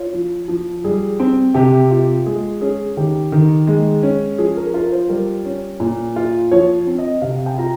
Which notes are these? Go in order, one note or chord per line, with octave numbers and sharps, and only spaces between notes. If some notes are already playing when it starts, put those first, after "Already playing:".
Already playing: F4 C#5
F3
F3
G3 G#4
C4
C3 G4
F4
G#3 G#4
C#4 G#4
D#3 G4
D#3
G#3
C#4
F3 G#4
A#4
F4 A#4
C5
G3 A#4
C#4
A#2
F4
F3 C#5
C4
D#5
C3 F5
G5
F4 A#5